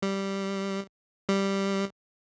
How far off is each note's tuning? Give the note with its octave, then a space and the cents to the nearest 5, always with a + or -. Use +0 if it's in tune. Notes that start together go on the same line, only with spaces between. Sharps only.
G3 -5
G3 +0